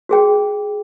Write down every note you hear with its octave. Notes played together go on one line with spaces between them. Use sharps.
F#4 G#4 G5